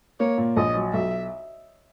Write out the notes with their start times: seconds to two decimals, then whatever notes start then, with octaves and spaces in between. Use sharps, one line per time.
0.20 A#3 C#5
0.38 A#2
0.57 A#1 D#5
0.75 F#3
0.93 B1 E5